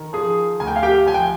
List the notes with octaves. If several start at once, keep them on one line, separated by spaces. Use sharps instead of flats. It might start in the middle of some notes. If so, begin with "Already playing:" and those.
Already playing: D#3
F3 G#4
D2 G#5
G5
F5
G4 G5
F3 G#5
G5